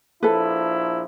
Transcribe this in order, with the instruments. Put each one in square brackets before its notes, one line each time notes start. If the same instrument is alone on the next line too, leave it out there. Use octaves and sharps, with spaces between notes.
[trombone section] A#1 F3 E4 [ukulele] A4 B4